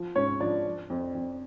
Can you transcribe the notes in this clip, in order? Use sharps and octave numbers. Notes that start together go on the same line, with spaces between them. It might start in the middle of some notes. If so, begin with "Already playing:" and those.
Already playing: F3
G#2 C#4 C#5
F3 D4 D5
F3
F2
F2